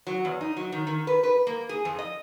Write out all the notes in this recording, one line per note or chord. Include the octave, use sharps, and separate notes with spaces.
F#3
E2
D#4
F#3
D#3
D#3
B4
B4
A#3
G#4
F2
D#5